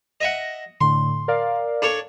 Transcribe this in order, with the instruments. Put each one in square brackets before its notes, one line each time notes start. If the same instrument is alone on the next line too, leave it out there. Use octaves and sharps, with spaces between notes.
[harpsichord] D#5 E5 F#5 [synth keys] A#6
[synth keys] A2 D3 [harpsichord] C6
[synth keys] A#4 D5 F5
[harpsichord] D4 A4 C#5